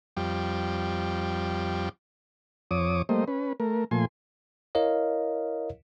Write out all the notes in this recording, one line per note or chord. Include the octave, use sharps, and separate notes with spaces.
F2 G3
F2 C#5 D6 D#6
G3 A3 A#3 C5 D#5
C#4 B4
A3 A#4
A#2 F3 A3 G#5 C6
E4 A#4 C#5 D#5 F5